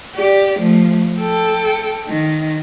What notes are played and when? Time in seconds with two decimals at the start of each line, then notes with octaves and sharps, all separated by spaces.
0.16 G4 D5
0.60 F3 A3
1.21 A4 G5
2.07 D#3